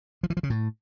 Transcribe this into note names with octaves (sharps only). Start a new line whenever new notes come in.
F3
E3
F3
C#3
A2